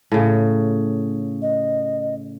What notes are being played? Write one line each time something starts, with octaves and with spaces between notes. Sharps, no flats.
A2 C#3
D#5